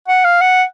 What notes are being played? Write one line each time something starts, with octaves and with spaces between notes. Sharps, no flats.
F#5
F5
F#5